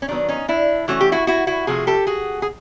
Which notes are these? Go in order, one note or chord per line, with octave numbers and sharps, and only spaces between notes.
C#4
D#3 F#3 B3 D4
C#4 D#4
D4 E4
E3 A3 C#4 F#4
G4
E4 F#4
E4 F#4
E4 F#4
C3 F3 A3 F#4 G#4
G4 A4
F#4 G#4
G#4